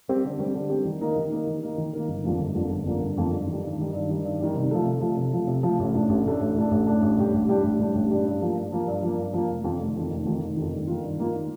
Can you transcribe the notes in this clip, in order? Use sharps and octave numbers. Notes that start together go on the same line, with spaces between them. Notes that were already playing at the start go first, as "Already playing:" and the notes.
G3 C4 G4
D3
G3 C4 G4
D3
G3 C4 G4
D#3
A#3 D#4 A#4
D#3
A#3 D#4 A#4
D#3
A#3 D#4 A#4
D#3
A#3 D#4 A#4
G1
F2 D3 F3 A#3
G1
F2 D3 F3 A#3
G1
F2 D3 F3 A#3
G1
F2 D3 F3 A#3
G2
D#3 G3
G2
D#3 G3
G2
D#3 G3
G2
D#3 G3
C3
F3 A3
C3
F3 A3
C3
F3 A3
C3
F3 A3
A1
A2 A3 D4
A1
A2 A3 D4
A1
A2 A3 D4
A1
A2 A3 D4
A1
A2 G3 D4 G4
A1
A2 G3 D4 G4
A1
A2 G3 D4 G4
A1
A2 G3 D4 G4
G2
F3 A#3
G2
F3 A#3
G2
F3 A#3
G2
F3 A#3
F1
F2 D#3
F1
F2 D#3
F1
F2 D#3
F1
F2 D#3
G2
D#3 A#3 F4
G2
D#3 A#3 F4